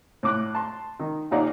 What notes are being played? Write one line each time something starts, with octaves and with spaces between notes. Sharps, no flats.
A2 D6 F#6
A5 C6
D#3
D#2 A#2 D#4 D5 F5 F#5